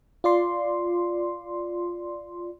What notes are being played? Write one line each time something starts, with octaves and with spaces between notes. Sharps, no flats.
F4 D5 C6